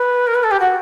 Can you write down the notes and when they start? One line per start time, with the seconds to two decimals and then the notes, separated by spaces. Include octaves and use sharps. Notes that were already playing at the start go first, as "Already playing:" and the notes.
Already playing: B4
0.27 A#4
0.34 B4
0.43 A4
0.51 G4
0.60 F#4